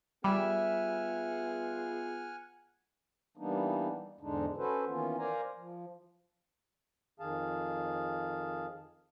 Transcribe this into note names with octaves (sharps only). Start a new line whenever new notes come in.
G3 B3 F4 G#4 E5 F#5 G#5 F6
E3 G3 A#3 B3 D4 D#4
E2 G#2 D3 G#3 D4 D#4
C#4 F#4 A4 B4 C5
D#3 E3 A#3 B3 C#4 F4
A#4 C5 D5 F5 G#5 A#5
F3
F2 D#3 G#4 F5 A5